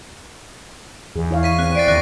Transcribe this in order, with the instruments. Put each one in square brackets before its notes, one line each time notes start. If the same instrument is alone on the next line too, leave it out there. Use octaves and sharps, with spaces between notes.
[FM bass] E2 [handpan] G#4
[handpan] E4 C#5 F5
[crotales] C#6 B6 D#7
[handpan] C4 [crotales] F#6
[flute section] D5 [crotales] A6 C7 D7
[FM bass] D#2 [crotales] C#6 F#6 A#6